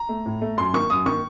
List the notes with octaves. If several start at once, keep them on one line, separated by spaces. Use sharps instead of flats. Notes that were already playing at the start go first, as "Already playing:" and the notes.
Already playing: A#5
A3
A2
A3
F#2 C6
D#3 A#3 C#6
F#2 D#6
D#3 A#3 C#6